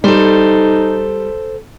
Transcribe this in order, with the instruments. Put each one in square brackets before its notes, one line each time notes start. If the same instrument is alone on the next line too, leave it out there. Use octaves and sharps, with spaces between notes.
[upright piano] G3 [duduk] D#4 [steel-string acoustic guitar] A4 C5